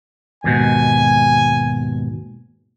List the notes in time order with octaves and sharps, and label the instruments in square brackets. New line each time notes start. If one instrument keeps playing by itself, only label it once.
[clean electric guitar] D#2 G#2 B2 [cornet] G#5